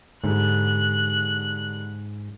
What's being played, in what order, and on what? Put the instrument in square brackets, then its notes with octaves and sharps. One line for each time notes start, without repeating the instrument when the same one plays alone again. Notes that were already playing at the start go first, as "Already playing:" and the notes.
[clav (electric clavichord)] G#2 [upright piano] D3 G3 [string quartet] F#6